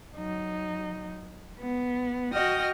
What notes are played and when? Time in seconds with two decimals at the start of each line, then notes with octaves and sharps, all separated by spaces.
0.15 F#3 D#4
1.58 B3
2.33 F#4 D#5 G5 D#6 F6